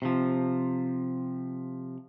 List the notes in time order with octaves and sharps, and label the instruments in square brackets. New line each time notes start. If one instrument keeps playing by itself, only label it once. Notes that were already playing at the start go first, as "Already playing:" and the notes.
[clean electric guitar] C3 F3